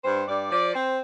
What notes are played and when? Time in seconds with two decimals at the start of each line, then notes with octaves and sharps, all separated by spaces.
0.03 G2 C5
0.26 G2 D5
0.50 F3 D5
0.73 C4 C5